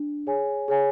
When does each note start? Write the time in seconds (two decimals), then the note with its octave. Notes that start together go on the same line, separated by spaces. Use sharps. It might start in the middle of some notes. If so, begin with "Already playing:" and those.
Already playing: D4
0.27 G#4 C#5 G#5
0.68 G#4 C#5 G#5